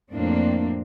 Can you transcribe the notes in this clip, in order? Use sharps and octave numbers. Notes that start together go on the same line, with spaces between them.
F2 A2 A#3 C4 D4